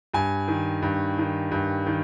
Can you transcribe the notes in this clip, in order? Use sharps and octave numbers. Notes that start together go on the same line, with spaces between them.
G2 G#5
D#3
G2
D#3
G2
D#3